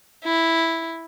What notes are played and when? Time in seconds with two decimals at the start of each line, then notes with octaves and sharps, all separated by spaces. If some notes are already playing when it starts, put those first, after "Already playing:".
0.24 E4